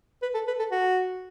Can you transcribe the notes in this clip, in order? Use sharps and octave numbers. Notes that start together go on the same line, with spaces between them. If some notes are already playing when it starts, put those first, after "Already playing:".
B4
A4
B4
A4
F#4